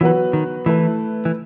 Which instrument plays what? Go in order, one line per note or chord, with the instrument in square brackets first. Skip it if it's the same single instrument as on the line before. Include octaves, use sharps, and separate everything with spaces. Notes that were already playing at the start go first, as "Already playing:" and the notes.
[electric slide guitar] E3 [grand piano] F#3 B3 F#4 B4
[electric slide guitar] D#3
[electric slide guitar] E3 [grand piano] A3 E4 B4
[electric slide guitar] E3